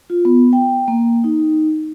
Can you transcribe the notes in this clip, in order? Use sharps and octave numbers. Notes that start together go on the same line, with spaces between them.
F4
B3
G5
A#3
D#4